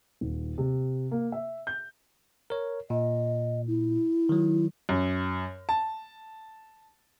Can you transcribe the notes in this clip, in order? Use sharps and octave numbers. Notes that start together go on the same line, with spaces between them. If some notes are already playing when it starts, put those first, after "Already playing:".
D#1
C3
A#3
E5
G6
A#4 C#5
A#2 D#5
E4
D#3 F#3
F#2
A5